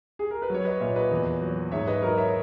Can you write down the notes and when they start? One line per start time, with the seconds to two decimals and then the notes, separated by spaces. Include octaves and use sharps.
0.19 G#4
0.31 A#4
0.42 B4
0.50 F#3 C#5
0.65 B4 D#5
0.80 A#2 C#5 E5
0.96 B4 D#5
1.11 E2
1.41 F#3
1.72 G#2 C#5 E5
1.87 B4 D#5
2.03 F#3 A#4 C#5
2.18 C#5 E5